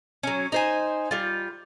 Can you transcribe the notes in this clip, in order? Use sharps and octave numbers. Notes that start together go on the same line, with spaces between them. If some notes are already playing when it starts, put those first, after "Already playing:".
F#3 C#4
D#4 C5 G#5
G3 F4